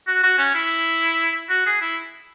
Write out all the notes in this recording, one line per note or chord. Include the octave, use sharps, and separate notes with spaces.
F#4
F#4
C#4
E4
F#4
G#4
E4